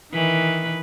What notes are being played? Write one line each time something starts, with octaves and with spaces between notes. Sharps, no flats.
D#3 E3 B4